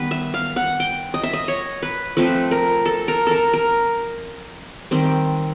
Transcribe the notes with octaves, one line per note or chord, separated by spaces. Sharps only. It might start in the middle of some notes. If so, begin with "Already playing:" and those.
Already playing: D#3 G3 B3 B4
E5
F5
F#5
G5
D#5
E5
D#5
C#5
B4
F3 A3 C4 B4
A#4
A4
A#4
A4 A#4
A#4
D#3 G3 C4